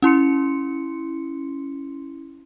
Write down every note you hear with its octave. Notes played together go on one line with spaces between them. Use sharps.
C#4 E4 C6 C#7